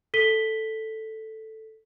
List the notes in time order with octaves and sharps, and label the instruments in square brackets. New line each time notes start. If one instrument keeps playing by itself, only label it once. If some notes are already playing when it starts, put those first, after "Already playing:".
[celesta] A4 B6 D#7 G7